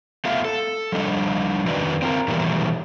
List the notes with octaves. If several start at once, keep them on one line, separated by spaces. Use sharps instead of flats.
A3 B3 F4 E5 F5
A4
F3 G3 D4 D#5
F2 D3 D#3 F#4 B4 D5
C4 F4 A#4
B2 D#3 E3 F#3 G3 A3